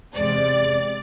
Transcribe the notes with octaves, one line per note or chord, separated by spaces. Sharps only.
E2 C3 G#3 D5